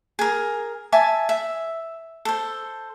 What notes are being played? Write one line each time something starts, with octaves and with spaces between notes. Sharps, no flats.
G#4 A#4
E5 G#5 A5 D6
E5
A4 C5